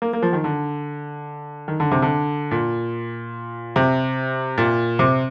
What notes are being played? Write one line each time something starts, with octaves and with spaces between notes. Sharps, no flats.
A#3
A#3
F3
D#3
D3
D#3
D3
C3
D3
A#2
C3
A#2
C3